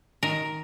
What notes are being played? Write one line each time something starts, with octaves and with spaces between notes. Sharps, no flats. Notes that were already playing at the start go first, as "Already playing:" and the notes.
D#3 A#4